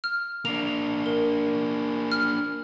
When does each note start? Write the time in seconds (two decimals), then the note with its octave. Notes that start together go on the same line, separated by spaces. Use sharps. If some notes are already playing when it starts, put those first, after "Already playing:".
0.04 F6
0.45 A#3 D4 F7
1.06 A#4
2.12 F6